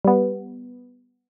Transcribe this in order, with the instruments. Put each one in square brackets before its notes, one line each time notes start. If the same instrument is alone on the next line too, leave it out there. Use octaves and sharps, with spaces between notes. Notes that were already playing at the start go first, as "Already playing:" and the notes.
[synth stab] G3 B3